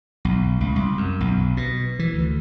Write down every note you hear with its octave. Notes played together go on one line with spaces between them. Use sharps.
B1
C#2
C2
F#2
B1
B2
E3
D2